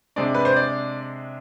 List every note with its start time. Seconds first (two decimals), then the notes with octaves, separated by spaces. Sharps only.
0.16 C3 G#3 D4 D5
0.35 B4
0.45 C5
0.56 D5